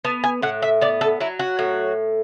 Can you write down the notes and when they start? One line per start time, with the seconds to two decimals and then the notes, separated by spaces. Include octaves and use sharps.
0.05 B3 A5
0.24 G#5
0.42 A2 F#5
0.62 E5
0.81 B3 D5
1.01 A4
1.20 F#3 E4
1.39 F#4
1.59 A2